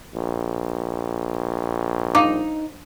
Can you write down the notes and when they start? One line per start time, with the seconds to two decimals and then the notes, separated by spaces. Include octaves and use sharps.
0.15 A#1
2.15 D#4 F5 D6